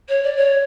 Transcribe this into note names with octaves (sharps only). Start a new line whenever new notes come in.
C#5
D5
C#5